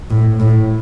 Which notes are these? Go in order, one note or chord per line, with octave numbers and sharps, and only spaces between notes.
A2
A2